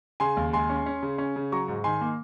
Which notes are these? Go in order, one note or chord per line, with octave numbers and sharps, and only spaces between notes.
C#3 G#5 C6
D#2
G#3 G#5 C6
C#4
C#4
C#3
C#4
C#3
F#3 A#5 C#6
G#2
D#3 G#5 C6
A#3